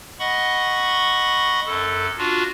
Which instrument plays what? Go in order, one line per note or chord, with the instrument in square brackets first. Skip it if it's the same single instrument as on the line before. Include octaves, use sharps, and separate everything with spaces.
[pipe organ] D#5 F#5 B5 C#6
F#2 A4
D4 F4 F#4